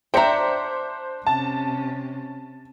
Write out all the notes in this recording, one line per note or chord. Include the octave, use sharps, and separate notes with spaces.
D4 C5 E5 G5 A#5 C#7
C3 C#4 A5